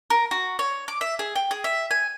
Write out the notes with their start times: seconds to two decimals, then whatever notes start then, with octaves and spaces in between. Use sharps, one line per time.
0.10 A#4
0.31 F#4
0.59 C#5
0.88 D6
1.01 E5
1.19 G#4
1.36 G5
1.51 G#4
1.64 E5
1.91 G#5